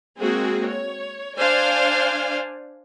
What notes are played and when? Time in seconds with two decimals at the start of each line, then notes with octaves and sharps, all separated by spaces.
0.20 G#3 A#3 C4 F#4 G#4
0.68 C#5
1.38 D4 C5 D5 F5 G#5